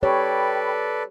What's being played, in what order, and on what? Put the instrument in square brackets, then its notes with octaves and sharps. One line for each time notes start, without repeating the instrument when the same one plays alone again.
[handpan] G4 C#5 [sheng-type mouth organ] A4 B4 D5 [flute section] G5 B5